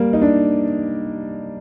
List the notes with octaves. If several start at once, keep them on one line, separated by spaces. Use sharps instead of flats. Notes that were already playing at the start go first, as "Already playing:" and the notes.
Already playing: G3 A#3
D#4
D4